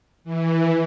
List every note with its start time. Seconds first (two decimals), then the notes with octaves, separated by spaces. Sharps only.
0.24 E3